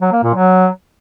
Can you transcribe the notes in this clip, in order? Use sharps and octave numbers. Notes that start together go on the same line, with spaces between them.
F#3
A#3
A#2
F#3